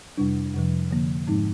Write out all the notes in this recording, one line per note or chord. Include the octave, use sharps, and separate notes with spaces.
F2 C3 G3 D4
F2 C3 F3
D3 F3 A#3
G#2 F3 G#3 C4 D#4